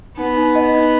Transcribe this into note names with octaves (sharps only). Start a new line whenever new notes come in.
B3 D#4
D#4
D#5
D#4